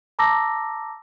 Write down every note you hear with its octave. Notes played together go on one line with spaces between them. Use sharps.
A5 A#5 D6 E6 A#6